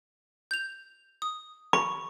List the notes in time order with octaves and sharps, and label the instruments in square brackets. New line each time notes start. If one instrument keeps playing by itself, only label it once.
[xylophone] G6 F7
D#6
[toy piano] B5 [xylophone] C#6